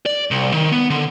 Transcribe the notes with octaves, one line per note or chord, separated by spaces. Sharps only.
D5
C2
D#3
B3
D3